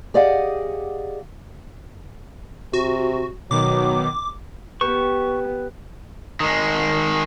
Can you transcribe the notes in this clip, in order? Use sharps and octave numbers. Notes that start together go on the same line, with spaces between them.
G4 G#4 D5 D#5 F5 F#5
C3 F#4
B2 D#3 F#3 D6
B3 G4 B4 C#6
D#3 G#3